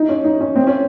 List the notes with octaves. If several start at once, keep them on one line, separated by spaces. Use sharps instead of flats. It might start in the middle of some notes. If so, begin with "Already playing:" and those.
Already playing: D#4
C#4
D#4
C#4
C4
C#4